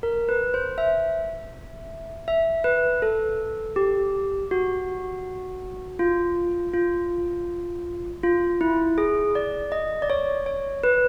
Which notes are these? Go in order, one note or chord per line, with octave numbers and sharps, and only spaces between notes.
A#4
B4
C5
E5
E5
B4
A4
G4
F#4
F4
F4
F4
E4
G#4
D5
D#5
D5
C#5
C#5
B4